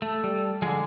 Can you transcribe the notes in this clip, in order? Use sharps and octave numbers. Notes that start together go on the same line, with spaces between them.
A3 A4
G3
D3 F3 G#3 G#4